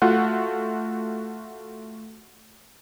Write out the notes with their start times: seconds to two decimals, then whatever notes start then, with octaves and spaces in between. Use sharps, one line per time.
0.02 A3 F4 F#4 F#5